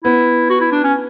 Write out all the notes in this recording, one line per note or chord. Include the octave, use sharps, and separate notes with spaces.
B3 E4
F#4
E4
D4
C#4